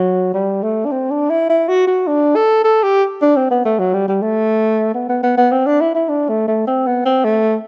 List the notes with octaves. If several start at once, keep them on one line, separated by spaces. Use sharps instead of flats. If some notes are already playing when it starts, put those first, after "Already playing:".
Already playing: F#3
G3
A3
D4
C4
D4
E4
E4
F#4
F#4
D4
A4
A4
G4
D4
C4
B3
A3
F#3
G3
G3
A3
B3
B3
B3
B3
C4
D4
E4
E4
D4
A3
A3
C4
B3
C4
A3